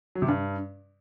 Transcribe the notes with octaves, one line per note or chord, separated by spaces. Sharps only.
F#3
C3
G2